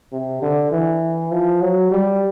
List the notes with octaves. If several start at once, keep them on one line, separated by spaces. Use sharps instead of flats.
C3
D3
E3
F3
F#3
G3